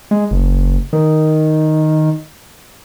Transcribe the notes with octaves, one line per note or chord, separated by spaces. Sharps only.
G#3
F#1
D#3